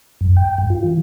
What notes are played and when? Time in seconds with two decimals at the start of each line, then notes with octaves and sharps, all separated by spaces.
0.21 F#2
0.37 G5
0.58 G2
0.70 F4
0.84 E3